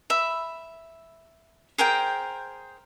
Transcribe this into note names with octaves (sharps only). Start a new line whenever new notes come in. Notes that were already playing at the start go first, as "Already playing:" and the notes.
E5 B5
G#4 A#4 C5 G5